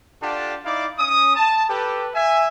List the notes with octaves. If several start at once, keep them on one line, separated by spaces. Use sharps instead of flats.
D4 F4 G4 A4 F#5 A5
D#4 E4 D5 F5 D6
C#4 D#6
A5
G4 A4 B4
E5 G#5